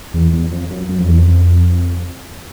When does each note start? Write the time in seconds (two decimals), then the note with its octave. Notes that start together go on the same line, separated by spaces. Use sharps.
0.14 E2
0.33 E2
0.51 F2
0.70 F#2
0.89 F#2
0.98 F2
1.08 E2
1.17 F2